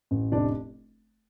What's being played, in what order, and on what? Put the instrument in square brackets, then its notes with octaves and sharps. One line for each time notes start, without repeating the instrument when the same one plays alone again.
[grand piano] A1
F1 D4 D5